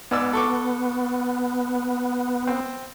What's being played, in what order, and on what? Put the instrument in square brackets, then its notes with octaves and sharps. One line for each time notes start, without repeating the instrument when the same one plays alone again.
[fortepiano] G#2 D5 E6 [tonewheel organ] B3
[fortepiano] A4 C#6 D6
C4